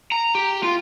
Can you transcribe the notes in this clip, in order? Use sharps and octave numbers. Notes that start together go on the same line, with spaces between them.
A#5
G4
F4